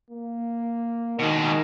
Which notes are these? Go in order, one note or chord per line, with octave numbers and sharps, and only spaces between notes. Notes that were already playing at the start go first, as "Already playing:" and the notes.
A#3
B2 D#3 G#3